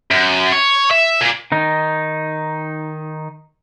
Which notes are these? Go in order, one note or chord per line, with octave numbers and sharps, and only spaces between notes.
F#2
C#5
E5
A#2
D#3 D#4